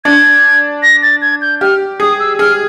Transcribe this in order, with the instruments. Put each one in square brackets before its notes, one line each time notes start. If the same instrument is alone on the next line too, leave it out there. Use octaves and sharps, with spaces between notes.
[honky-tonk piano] D4 [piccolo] G#6
[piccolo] A#6
A6
G#6
G6
[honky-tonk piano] G4 [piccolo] F6
[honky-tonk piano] G#4 [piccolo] D#6
[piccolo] E6
[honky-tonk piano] G#4 [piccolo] F6